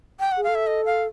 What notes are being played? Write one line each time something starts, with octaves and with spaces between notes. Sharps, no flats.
G5
F#5
G#4
A4 F5
E5
D#5
F5